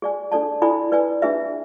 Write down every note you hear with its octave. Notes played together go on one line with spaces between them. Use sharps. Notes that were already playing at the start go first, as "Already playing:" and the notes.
G#4 D5 G#5
D4 A4 D5 A5
E4 A4 D5 G#5 B5
B4 D5 G#5
D4 G#4 B4 E5